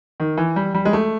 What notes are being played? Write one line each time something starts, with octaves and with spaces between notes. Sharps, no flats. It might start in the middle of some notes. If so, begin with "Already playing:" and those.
D#3
E3
G3
G3
G#3
A3